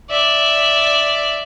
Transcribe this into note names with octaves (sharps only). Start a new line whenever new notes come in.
D5 E5